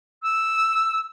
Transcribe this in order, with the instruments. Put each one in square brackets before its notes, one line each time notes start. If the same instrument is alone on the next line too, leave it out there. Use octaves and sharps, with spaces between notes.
[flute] E6